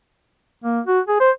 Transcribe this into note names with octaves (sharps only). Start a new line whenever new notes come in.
A#3
F#4
G#4
C5